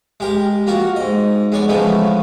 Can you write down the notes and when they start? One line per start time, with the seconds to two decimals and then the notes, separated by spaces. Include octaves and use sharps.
0.20 G#3 G4 A#4
0.67 A#3 F4 F#4 A#4
0.96 G#2 D#5
1.52 G#3 B3 C#5 D5
1.68 C#3 E3 F3 G#3 A3 B3